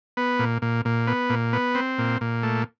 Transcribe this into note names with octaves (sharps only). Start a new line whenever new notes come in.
B3
A#2
A#2
A#2
B3
A#2
B3
C4
A#2
A#2
A3